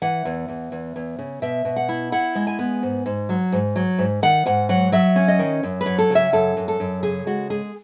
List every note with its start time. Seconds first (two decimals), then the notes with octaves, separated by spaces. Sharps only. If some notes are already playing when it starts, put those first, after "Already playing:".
0.02 E3 F#5
0.25 E2
0.48 E2
0.72 E2
0.96 E2
1.19 C#3
1.42 B2 E5
1.65 B2
1.76 F#5
1.89 E4
2.12 E4 F#5
2.35 G#3
2.47 G#5
2.59 B3
2.83 G#2
3.06 G#2
3.29 F#3
3.53 G#2
3.76 F#3
3.99 G#2
4.23 D#3 F#5
4.46 G#2 F#5
4.69 F#3 F#5
4.92 F#3 E5
5.16 C#4
5.28 D#5
5.39 D#3
5.63 F#2
5.81 B4
5.86 F#3
5.98 A4
6.10 C#3
6.15 E5
6.33 F#2 A4
6.57 F#2
6.68 A4
6.80 F#2
7.03 C#3 G#4
7.27 G#3 F#4
7.50 G#3 G#4